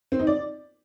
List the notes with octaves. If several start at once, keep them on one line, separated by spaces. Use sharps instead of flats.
C4
D#4
D5